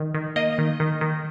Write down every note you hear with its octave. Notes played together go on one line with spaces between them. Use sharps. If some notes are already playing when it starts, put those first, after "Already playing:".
Already playing: D#3
D#3
A#3 D#5
D#3
D#3
D#3